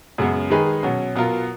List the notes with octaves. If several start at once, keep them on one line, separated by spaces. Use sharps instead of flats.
F#2 C#3 G#3 B3
D#3 G#3 D#4 G#4 B4
B2 F#3 C#4
B2 F#3 B3 F4 A#4